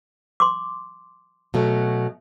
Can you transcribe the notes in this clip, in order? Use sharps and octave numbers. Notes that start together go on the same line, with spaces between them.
C6 D6
B2 F#3 A3